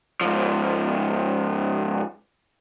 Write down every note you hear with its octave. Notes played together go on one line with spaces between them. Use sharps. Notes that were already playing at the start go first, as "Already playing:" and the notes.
G#2 F3